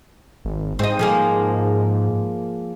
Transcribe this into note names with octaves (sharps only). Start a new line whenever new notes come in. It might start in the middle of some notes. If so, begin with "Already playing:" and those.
G#1
G#2 C4 D#5
F3 G#3 A#3